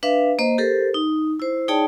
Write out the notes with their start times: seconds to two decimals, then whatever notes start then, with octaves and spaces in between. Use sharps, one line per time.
0.03 D4 B4 E5 F5
0.39 A#3 C5 D#5
0.58 G4 A4 A#4 C5
0.94 D#4
1.40 E4 C5
1.68 D#4 G#4 C#5 D5 G5 A5